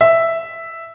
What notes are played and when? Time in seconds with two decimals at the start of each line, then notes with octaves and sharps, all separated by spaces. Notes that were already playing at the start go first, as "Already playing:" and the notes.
0.01 E5